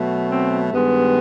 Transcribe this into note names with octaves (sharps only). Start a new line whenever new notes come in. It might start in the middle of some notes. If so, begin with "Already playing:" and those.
Already playing: B2 F#3 A3
C4
G2 D#3 G#3 B3